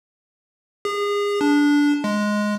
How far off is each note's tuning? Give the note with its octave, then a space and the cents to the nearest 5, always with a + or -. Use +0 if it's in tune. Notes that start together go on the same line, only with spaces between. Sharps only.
G#4 -30
D4 -15
G#3 +5